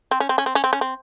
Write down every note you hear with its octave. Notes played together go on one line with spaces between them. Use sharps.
C4
C#4
C4
C#4
C4
C#4
C4
C#4
C4